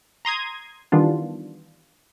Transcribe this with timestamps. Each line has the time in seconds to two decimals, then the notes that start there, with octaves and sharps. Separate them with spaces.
0.25 A#5 C6 D#6 G#6
0.92 D#3 E3 G3 B3 D4 F4